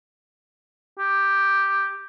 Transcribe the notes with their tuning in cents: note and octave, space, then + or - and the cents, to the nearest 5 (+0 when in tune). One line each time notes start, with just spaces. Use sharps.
G4 +5